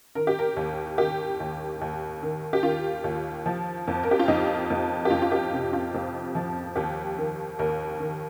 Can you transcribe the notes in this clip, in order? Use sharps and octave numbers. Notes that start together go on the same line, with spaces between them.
D#3 A#4
G4
A#4
D#2
D#3 G4
D#2
D#2
D#3
G4
D#3 F4
D#2
F3
F2
A#4
G4
F4
F2 D#4
F2
G4
F2 F4
F4
G4
C3
F4
F2
F3
D#2 G4
D#3
D#2 A#4
D#3